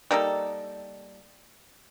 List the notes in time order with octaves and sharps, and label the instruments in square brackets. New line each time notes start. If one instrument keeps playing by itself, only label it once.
[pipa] G3 A#3 D#4 A4